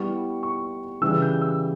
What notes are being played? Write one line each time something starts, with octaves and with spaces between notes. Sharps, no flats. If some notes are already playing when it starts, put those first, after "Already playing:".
Already playing: G3 B3 E4 C#6
C#6
C#3 E3 G3 E6
G6
E6